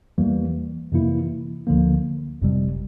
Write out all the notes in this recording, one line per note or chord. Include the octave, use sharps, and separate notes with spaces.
E2 E3 G3 A#3
F2 C3 E3 A#3 E4
D2 D3 F3 A#3
G1 F2 C3 G3